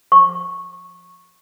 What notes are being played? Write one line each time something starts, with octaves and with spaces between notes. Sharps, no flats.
C#6